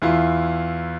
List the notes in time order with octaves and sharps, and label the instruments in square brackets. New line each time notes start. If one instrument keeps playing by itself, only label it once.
[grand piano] E2 E4 F4